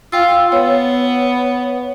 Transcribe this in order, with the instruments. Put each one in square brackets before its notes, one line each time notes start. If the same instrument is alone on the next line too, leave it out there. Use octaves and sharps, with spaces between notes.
[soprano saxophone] F4 [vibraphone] F5 G5 E6
[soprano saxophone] B3 [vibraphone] C#5